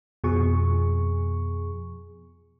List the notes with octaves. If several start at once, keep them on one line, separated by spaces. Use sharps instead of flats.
F2 B2 F3 G#4 C#6